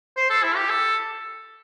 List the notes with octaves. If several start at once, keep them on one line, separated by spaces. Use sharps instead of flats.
C5
A4
E4
G4
A4